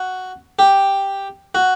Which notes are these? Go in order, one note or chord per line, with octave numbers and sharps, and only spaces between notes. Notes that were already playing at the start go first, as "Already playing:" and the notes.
Already playing: F#4
G4
F#4